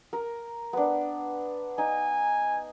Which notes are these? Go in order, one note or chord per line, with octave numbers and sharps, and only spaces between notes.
A#4
B3 D4
D#4 G#5